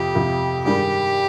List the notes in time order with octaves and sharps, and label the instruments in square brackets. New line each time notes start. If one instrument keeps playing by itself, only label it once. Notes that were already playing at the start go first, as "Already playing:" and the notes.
Already playing: [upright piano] F2 C3 F3 [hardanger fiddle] G4
[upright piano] F2 C3 F3
[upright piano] G2 D#3 G3 D4 G#4 [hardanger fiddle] G4